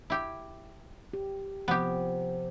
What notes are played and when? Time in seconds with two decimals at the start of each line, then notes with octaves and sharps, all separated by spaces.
0.10 E4 G4
1.13 G4
1.68 C3 F3 B3 G4